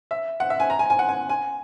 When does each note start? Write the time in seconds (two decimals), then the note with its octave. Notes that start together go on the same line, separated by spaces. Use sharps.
0.11 E5
0.40 F#5
0.50 E5
0.60 G#5
0.70 A#5
0.79 G#5
0.90 G#5
0.99 F#5
1.09 G#5
1.29 G#5